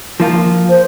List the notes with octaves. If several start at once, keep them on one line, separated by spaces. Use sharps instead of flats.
F3 A#3 F4
C5